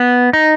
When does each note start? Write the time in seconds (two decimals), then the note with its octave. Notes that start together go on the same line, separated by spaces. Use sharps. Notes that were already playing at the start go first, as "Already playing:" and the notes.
Already playing: B3
0.33 D#4